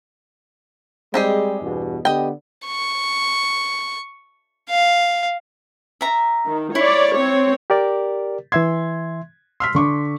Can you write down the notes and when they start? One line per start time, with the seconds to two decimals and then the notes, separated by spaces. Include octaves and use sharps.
1.14 G3 G#3 C4 G4 G#4
1.62 E2 G2 B2
2.05 D3 B3 G4 D#5 G5
2.66 C#6
4.70 F5
6.01 E5 A#5
6.46 D#3
6.75 E4 C#5 D5
7.13 C4 C#5
7.70 G4 A#4 D5
8.52 E3 E5 C6 G#6
9.60 C6 E6 F6 B6
9.75 D3 C#6 D6